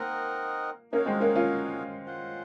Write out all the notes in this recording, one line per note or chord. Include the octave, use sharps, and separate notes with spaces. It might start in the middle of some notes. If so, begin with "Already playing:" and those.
Already playing: A#3 C4 D#4 A#4 D#5 F#5
A#3 C#4 D#4 F#4 A#4 C#5 F5
G#3 C4
A#3 C#4
C#4 F4
F4 C5 F#5